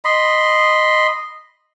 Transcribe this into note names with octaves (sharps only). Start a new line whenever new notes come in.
D#5 B5 C6